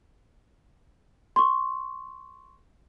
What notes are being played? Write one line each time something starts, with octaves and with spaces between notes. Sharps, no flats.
C6 C#6